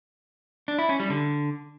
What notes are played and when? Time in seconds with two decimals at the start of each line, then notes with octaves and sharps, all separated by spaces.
0.68 D4
0.79 E4
0.89 C#4
1.00 G3
1.10 D3